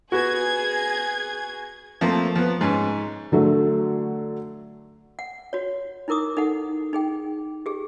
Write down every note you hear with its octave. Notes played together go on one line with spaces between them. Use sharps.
B3 F#4 G#4 G#6
F3 A3 A#3 C4
F3 B3
G#2 C#4
D3 F#3 A3
F#5
F#4 C#5
D#4 E4 A#4 D6 D#6
D#4 A4 F#5
D#4 G#4 G5
G4 G#4